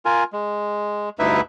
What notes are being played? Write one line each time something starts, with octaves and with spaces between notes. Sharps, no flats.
F4 A#4 G#5
G#3
D2 G2 D#4 E4 B4 E5